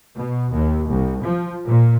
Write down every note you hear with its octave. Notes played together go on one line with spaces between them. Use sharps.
B2
D#2
C2
F3
A#2